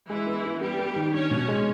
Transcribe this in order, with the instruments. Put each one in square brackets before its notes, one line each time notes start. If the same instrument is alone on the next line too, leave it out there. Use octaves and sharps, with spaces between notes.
[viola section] E3 E4 [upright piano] G#3
[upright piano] B3
B3
[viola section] G3 G4 [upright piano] B3
[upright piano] B3
D#3
[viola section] C#4 C#5 [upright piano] D4
[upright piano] B2
G#3